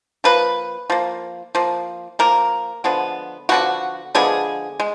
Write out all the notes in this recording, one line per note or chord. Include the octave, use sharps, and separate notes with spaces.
F3 A#3 B4
F3 A#3
F3 A#3
F3 A#3 A#4
D3 F3 G#3 B3
D3 F3 G#3 B3 F#4
D3 F3 G#3 B3 G#4
G#3